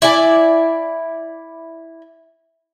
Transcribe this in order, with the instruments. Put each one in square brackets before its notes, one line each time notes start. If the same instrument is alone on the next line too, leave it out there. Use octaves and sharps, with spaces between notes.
[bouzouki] E4 D5 G#5